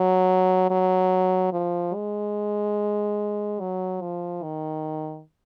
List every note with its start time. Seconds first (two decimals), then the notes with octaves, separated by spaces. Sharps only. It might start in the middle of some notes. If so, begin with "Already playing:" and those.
Already playing: F#3
0.71 F#3
1.53 F3
1.95 G#3
3.60 F#3
4.02 F3
4.43 D#3